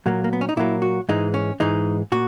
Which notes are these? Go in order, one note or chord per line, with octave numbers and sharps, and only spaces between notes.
A#2 F#3 A#3
A#3
B3
C#4
D#4
A#2 F#3 A#3 E4
F#4
G#2 E3 G#3 D#4
C#4
G#2 E3 G#3 D#4
A#2 F#4